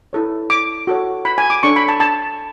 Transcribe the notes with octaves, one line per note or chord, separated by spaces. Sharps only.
E4 A4 C#5
D6
F#4 A4 C#5
B5
G#5
D6
D4 A4 C#5 C#6
B5
A5
A5